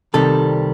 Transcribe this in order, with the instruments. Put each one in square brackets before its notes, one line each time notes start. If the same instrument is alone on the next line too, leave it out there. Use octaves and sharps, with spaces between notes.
[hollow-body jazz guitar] C2 C3 D#3 G3 A4